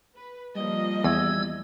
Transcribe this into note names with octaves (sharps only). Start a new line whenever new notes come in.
B4
F3 G3 A#3 D#5
E2 E6 G#6